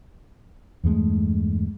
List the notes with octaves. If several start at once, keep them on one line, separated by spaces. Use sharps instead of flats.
E2 G2 G#3 A3